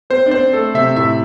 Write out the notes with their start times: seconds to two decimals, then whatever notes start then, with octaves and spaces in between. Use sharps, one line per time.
0.10 C4 C5
0.26 D4
0.31 C4 C5
0.53 A3 A4
0.74 C3 E5
0.96 A2 E5